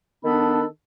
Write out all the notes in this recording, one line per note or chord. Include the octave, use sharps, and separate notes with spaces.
D#3 B3 D4 A4 B5